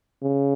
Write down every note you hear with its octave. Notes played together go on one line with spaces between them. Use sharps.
C#3